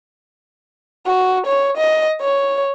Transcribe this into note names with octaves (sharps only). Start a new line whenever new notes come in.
F#4
C#5
D#5
C#5